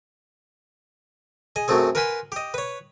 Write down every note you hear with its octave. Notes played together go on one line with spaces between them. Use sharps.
G#4 D#5
F#2 F#3 A3 C4 G#4
A#4 B4 F#5 G#5 B5 C6
G4 D#5
B4 C#5